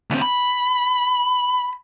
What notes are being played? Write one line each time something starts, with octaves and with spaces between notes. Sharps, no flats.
D2 C4
B5